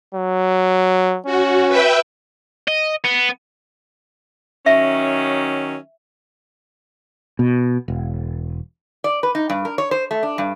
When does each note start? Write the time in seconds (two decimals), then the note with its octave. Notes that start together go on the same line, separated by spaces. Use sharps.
0.14 F#3
1.26 C#4 F#4
1.68 B4 E5 G5
2.68 D#5
3.04 B3
4.66 D#3 F#3 C#4 E5
7.39 B2
7.88 E1
9.04 D5
9.23 B4
9.35 D#4
9.50 G2
9.65 A#4
9.78 C#5
9.91 C5
10.11 A3
10.23 D4
10.38 G2